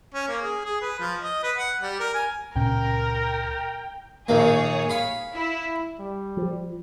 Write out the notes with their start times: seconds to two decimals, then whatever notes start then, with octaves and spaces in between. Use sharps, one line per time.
0.14 C#4
0.28 A#3
0.41 G#4
0.65 G#4
0.81 B4
0.99 F3
1.21 D#5
1.43 B4
1.56 F#5
1.81 G3
2.00 A#4
2.14 G#5
2.56 C#2 A#2 C#4 A#4 G5
4.29 A#1 D#2 A#3 G#4 C#5
4.90 F5 B5
5.35 E4
5.99 G3
6.37 F3